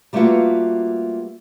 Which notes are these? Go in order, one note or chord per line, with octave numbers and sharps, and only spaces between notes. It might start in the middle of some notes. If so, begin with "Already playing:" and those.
G3 A3 A#3 F4 F#4 B4